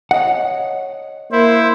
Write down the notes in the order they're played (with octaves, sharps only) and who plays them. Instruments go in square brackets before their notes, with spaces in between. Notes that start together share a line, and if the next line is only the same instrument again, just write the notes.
[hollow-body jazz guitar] C#5 D#5 F#5
[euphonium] A#3 [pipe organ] E4 [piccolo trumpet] C5